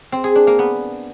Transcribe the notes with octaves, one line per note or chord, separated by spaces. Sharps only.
C4
G#4
D4
A#3
B3